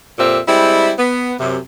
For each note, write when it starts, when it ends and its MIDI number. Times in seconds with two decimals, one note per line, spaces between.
0.18 0.39 41
0.18 0.39 46
0.18 0.39 60
0.18 0.39 67
0.18 0.39 76
0.47 0.91 55
0.47 0.91 56
0.47 0.91 60
0.47 0.91 64
0.98 1.33 59
1.39 1.56 42
1.39 1.56 48